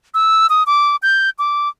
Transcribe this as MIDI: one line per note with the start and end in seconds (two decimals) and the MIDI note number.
0.14 0.47 88
0.50 0.63 87
0.66 0.96 86
1.03 1.30 91
1.39 1.69 86